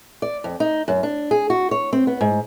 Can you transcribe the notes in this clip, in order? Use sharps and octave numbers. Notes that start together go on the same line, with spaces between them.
D5
F2
D#4
F#2
D4
G#4
F#4
C#5
C4
B3
G#2